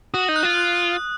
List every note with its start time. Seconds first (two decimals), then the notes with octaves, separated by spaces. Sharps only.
0.14 F#4 D#6
0.29 D#4
0.36 F#6
0.43 F4
0.57 F#6